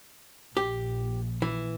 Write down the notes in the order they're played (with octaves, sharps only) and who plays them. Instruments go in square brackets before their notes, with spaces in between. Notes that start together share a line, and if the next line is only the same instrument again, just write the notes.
[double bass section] A#1 [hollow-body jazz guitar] G4
[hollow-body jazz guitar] E3